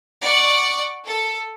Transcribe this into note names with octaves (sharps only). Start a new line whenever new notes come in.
D5 F#5 C#6
A4